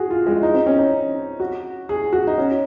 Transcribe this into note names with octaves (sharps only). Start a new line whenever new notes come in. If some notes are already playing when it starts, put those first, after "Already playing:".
Already playing: F#4 G#4
F4
G#3
D#4
C4
C#4
D#4
F#4
G#4
F#4
D#4
C#4